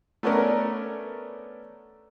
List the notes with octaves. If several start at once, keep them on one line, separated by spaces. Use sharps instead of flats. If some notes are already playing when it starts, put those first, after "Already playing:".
A3 B3 C#4 D4 A#4